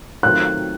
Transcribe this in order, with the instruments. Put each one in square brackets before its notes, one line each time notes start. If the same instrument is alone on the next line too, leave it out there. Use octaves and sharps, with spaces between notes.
[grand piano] D#3 F#3 A3 C4 F4 [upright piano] F#6